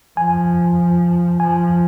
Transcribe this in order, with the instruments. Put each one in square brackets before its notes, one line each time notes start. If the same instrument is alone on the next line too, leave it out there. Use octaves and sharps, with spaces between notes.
[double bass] F3 [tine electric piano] G#5
[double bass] F3 [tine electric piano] G#5